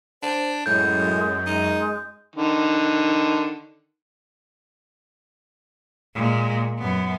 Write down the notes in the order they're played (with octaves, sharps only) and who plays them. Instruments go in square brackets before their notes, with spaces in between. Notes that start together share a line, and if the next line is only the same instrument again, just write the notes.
[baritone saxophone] D4 [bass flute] C5
[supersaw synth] F#2 [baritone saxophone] A2 [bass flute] G#3 [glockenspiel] G6
[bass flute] G#3 [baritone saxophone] D#4
[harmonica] D3 D#3
[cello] A#2 G#3
F#2 B3